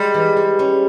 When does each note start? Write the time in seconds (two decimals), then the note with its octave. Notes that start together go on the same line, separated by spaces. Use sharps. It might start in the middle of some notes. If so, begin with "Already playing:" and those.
Already playing: G3 G#3
0.14 E3
0.37 G#3
0.59 C#4